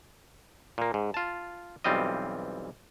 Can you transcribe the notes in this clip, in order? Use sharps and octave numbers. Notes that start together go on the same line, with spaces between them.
A#2 A#3
G#2
F4 A5
B1 E3 G3 C4 F4 D#5